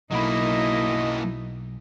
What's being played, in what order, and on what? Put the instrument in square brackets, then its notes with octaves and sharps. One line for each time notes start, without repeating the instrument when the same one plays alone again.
[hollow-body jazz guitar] B1 B5 [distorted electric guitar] F#3 A#3 [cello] D#4 E4 [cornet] D#5